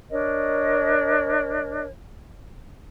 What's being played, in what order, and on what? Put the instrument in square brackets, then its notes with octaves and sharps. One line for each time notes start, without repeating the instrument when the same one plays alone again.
[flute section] D4 A#4 C#5 D#5